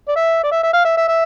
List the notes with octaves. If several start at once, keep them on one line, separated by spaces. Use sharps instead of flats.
D5
E5
D5
E5
E5
F5
E5
E5
E5